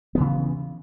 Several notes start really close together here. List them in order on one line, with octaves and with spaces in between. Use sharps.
B3 E3 C#3